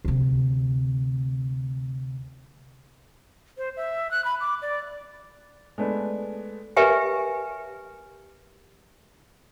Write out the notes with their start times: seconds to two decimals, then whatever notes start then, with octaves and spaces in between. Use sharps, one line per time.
0.05 D2 C3
3.58 C5
3.77 E5
4.11 F#6
4.25 B5
4.41 D6
4.62 D5
5.78 G#3 A3 B3 D4
6.76 G4 A#4 B4 E5 G#5